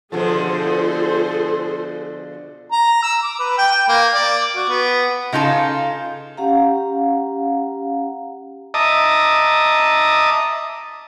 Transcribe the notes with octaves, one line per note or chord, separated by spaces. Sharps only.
B2 D3 F3 F4 G#4 A4 C5
A#5
E6
D6
B4
G5
G5
A#3
D5
F#4
B3
C#3 D#4 F4 A4
C#4 G4 F5 F#5 A#5
D#5 E5 A5 A#5 D6 D#6